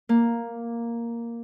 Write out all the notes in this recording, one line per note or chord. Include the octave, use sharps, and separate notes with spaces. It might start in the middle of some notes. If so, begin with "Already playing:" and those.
A#3